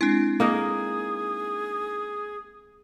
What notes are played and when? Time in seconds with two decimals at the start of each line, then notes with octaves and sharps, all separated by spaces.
0.01 G#3 C4 D4 E4
0.40 A#3 D#4 G#4 A#4